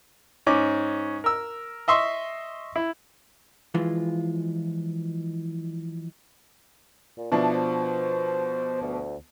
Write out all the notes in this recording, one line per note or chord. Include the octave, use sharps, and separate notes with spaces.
G#2 C#4 D6
A#4 E6
D#5 E5 C6 C#6
E4
E3 F3 G#3 F4
A#2
B2 F3 D4 E4
C5
D2